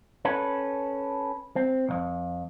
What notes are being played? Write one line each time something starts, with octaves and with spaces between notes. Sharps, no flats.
C#4 A4 B4
C4
B1 F2